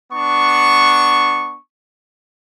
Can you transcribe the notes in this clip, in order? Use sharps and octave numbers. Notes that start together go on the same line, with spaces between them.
B3 D4 C#6